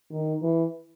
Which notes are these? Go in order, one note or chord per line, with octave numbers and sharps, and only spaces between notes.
D#3
E3